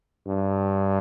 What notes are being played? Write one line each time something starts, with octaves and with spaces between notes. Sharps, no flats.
G2